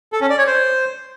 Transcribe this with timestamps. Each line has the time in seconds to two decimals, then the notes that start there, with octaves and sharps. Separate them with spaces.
0.13 A4
0.21 C#4
0.30 D5
0.38 C#5
0.47 C5